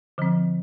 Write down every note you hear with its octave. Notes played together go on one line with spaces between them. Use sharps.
D3 F3 C4